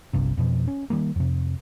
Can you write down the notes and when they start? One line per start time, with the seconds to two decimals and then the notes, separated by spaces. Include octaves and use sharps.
0.13 G1 C2 G2 C3
0.37 F2 B2 F3
0.68 C#4
0.90 D#3 G3 A#3
1.16 F2 C3